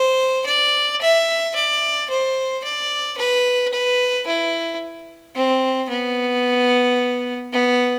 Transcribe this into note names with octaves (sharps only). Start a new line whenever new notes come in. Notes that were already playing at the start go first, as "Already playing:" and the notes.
Already playing: C5
D5
E5
D5
C5
D5
B4
B4
E4
C4
B3
B3